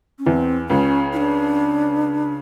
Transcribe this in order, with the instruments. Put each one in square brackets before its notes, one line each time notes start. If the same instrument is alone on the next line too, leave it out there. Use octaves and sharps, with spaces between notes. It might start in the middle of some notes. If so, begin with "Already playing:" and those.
[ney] C#4
[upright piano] E2 E3 [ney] C4
[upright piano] C#2 C#3 [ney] C#4
[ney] E4
D4